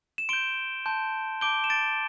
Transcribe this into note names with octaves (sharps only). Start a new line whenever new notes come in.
E7
C6 G6 D7 G7
A5 C6 G6
A5 D6 G6 D7 G7
E7
A6 D7